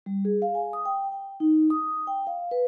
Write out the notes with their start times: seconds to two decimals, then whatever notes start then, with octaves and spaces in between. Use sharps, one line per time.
0.06 G3
0.25 G#4
0.42 F5
0.55 G#5
0.73 D#6
0.85 G5
1.12 G5
1.40 D#4
1.70 D#6
2.07 G5
2.27 F5
2.51 B4